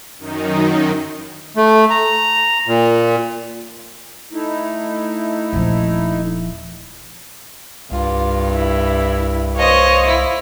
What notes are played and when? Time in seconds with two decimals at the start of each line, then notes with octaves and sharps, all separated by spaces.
0.19 F#2 D#3 D#4
1.57 A3
1.90 A#5
2.67 A#2
4.32 A3 D#4 E4
5.53 D#1 F3
7.91 C2 G2 F4
8.55 E4
9.57 C5 C#5 D#5 F5
10.07 E4